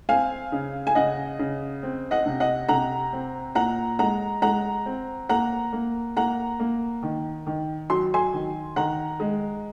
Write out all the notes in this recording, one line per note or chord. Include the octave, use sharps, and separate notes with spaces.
C4 F5 G#5
C#3
G#5
C#3 D#5 F#5
C#3
C4
D#5 F#5
C3
D#5 F#5
C3 F#5 A#5
C4
A#2 F#5 A#5
G#3 F#5 A#5
G#3 F#5 A#5
C4
A#3 F#5 A#5
A#3
A#3 F#5 A#5
A#3
D#3
D#3
F#3 C6
G#5 C6
D#3
D#3 F#5 A#5
G#3